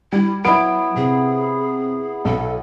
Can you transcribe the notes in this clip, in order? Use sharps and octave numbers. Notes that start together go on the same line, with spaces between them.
G3 E4
F#3 B3 E4 D7
C3 G#4
B1 A4